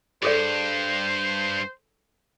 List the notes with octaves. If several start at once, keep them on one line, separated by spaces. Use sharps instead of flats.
G2 G#4 A4 C5 D5